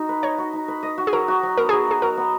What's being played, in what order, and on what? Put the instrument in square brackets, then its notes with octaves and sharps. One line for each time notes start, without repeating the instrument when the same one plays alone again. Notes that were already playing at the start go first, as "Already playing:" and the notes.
Already playing: [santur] D#4 F#4
B4
[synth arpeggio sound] C#5 [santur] D#5
[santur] F#4
D#4
B4
D#5
F#4
[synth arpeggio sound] G#4
[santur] F#3 [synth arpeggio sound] A#4
[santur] F#4
F#3
[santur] B3 [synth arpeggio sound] A#4
[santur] F#3 [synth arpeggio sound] G#4
[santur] F#4 [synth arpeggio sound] G#4
[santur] F#3 [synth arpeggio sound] A#4
[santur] B3